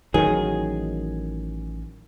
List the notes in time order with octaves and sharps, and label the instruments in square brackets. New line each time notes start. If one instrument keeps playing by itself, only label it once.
[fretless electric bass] A1 D#3 F#3 [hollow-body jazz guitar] G#4